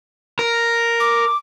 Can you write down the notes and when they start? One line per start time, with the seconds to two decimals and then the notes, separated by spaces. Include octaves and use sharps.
0.39 A#4
1.00 D6